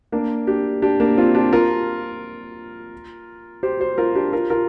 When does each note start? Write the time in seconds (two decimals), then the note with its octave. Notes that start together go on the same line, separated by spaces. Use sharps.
0.12 A#3 D4
0.47 D4 G4
0.82 D4 G4
1.00 A#3 D4
1.18 C4 F4
1.35 D4 G4
1.53 F4 A#4
3.63 G4 C5
3.80 G4 C5
3.98 F4 A#4
4.15 D4 G4
4.33 F4 A#4
4.50 F4 A#4